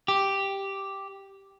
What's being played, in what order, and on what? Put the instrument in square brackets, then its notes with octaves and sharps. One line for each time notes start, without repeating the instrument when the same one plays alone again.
[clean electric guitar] G4